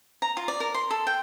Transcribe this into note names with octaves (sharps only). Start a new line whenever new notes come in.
A#5
F4
D5
A#4
C6
A4
G5